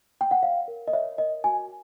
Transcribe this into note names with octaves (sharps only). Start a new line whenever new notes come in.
G5
F#5
C#5 F5
A#4
D#5
C#5 E5
A#4 D#5
F#4 G#5